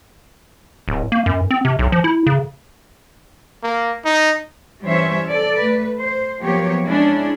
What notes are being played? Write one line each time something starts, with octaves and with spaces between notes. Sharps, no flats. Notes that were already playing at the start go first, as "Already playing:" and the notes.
D1
A#3
F#2
C4
C3
B1
F3
E4
C#3
A#3
D#4
E3 G3 C#4 C5 C#5 E5
A4 D5
A3 B4
C5
F3 F#3 A#3 B3 G4 C#5
G#3 C#4 D4 E4